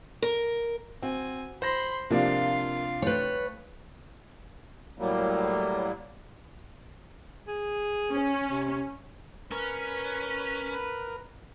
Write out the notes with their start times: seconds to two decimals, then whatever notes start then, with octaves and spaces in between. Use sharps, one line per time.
0.22 A#4
1.03 C4 F#4 G#5
1.62 C5 B5 C6 A#6
2.10 C3 F3 A#3 D4 F4 F5
3.02 A3 B4 C#5 G5
4.99 A2 F#3 G3 A#3
7.48 G#4
8.13 C#4
8.51 C3
9.51 C#4 A#4 B4